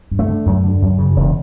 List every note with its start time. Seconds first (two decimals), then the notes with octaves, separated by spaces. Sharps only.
0.11 G2
0.19 A3
0.29 D3
0.46 F#2
0.63 D3
0.82 F#2
0.99 C#3
1.16 E1